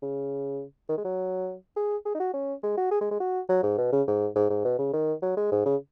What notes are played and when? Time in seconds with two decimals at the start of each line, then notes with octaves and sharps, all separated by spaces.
0.02 C#3
0.89 D#3
0.98 G#3
1.04 F#3
1.76 G#4
2.05 G#4
2.15 D#4
2.20 F#4
2.34 C#4
2.63 G#3
2.77 F#4
2.91 G#4
3.01 G#3
3.11 G#3
3.20 F#4
3.49 F#3
3.63 G#2
3.78 B2
3.92 C#3
4.08 G#2
4.36 G#2
4.50 G#2
4.65 B2
4.79 C#3
4.93 D#3
5.22 F#3
5.37 G#3
5.52 G#2
5.66 C#3